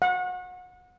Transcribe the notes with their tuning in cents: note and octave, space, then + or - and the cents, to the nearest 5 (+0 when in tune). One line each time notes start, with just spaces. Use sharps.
F#5 -30